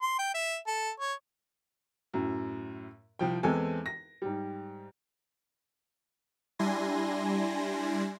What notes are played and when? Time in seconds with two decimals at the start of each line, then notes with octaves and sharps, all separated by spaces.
0.02 C6
0.19 G5
0.34 E5
0.67 A4
1.00 C#5
2.14 F#2 A2
3.19 C2 F3 G5
3.43 E2 E3 G#3 C4 A4 G#5
3.86 A#6
4.22 G#2 G3
6.59 G3 D4 E4 G#5 C6 A#6